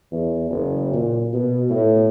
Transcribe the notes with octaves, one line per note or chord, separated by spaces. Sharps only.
E2
F#1
A#2
B2
A2